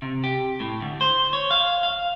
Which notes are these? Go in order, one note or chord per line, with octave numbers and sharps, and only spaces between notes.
C3
G4
A2
D2
C5
C#5
F5
F5